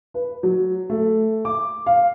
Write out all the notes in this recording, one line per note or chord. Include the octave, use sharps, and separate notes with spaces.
B4
F#3
A3
D6
F5